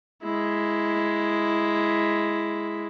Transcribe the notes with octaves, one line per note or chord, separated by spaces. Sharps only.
G#3 E4